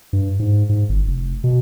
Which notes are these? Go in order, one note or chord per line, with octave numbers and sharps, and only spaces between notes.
G2
G#2
G#2
G1
F1
B2